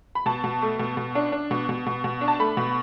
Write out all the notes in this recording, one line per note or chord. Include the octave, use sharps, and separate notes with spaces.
B5
B2 A5
B2
A3
B2
B2
D4
D4
B2
B2
B2
B2
D4
A5
A3 B5
B2